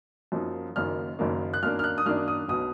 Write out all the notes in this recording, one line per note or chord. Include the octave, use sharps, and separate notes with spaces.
F#2 F3 A#3 D#4
F#1 F#2 D#3 A#3 F6
F#1 F#2 D#3 A#3
F#6
F#2 D#3 A#3 D4 F6
F6
F#6
D#6
F#2 D#3 A#3 D4 F6
D#6
B1 B2 F#3 D#6